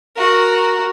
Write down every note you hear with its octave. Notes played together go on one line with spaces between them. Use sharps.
F#4 A#4